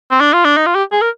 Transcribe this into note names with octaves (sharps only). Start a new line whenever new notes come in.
C4
D4
F4
D4
D#4
F4
G4
G#4
A#4